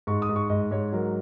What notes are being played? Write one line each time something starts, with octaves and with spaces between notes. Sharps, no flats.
G#2 C#6
D#6
G#2
C#6
G#2 D#5
G#2 C#5
F#3 A#4